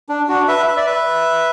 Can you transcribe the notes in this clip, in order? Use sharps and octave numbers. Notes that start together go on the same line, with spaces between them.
D4
D4 F#4
B4 E5
E5
D5
B4 E5